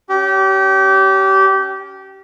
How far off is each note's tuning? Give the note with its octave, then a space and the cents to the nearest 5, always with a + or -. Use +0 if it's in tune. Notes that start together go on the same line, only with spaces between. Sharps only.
C#4 +25 G4 -25